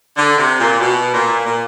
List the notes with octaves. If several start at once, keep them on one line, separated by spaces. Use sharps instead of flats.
D3
C3
A#2
B2
A#2
A#2